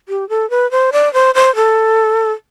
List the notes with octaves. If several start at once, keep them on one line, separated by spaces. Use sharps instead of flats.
G4
A4
B4
C5
D5
C5
C5
A4